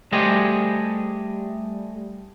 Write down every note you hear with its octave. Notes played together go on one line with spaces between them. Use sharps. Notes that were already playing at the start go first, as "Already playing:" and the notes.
G3 A3 G4 G#4 C5 D#5